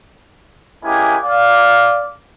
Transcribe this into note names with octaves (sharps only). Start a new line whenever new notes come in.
G#3 A#3 C#4 E4 G4 G#5
D5 F5